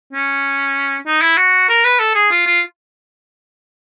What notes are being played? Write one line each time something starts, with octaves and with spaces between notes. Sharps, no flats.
C#4
D#4
E4
F#4
A#4
B4
A4
G#4
F4
F4